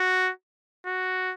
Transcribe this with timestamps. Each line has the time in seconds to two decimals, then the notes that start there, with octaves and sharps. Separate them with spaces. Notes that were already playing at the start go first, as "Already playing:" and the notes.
Already playing: F#4
0.86 F#4